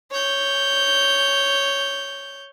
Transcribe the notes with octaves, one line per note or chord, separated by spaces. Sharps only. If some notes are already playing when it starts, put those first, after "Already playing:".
C#5 G6